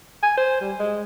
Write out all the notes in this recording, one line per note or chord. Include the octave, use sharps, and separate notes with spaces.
G#5
C5
G3
G#3